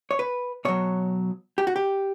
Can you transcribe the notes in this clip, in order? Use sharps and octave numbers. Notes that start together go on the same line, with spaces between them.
C#5
B4
B2 F#3 C#5
G4
F#4
G4